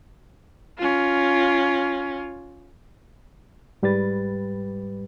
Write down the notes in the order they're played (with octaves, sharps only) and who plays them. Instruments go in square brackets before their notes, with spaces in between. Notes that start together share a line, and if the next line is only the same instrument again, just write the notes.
[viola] C#4 F4
[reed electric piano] G#2 G3 G4 B4 A6